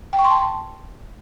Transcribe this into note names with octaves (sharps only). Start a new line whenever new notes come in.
G5
C#6
C6
A5